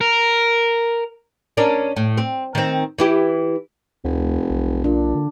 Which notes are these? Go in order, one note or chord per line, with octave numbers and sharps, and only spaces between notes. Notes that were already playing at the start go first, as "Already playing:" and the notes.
A#4
C#4 D4 A#4
A2
C4
D#3 C4
E3 E4 G4
F1 D2
B1
A#2 D4
D3